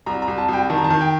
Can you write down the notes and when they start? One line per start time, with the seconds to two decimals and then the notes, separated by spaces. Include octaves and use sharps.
0.06 C2 A#5
0.22 A#5
0.28 C2
0.38 A5
0.48 C2 G5
0.70 D#3 A5
0.78 A#5
0.84 A5
0.90 D#3
1.01 G5